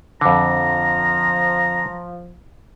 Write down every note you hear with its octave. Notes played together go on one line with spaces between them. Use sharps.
F2 D3 F3 A#5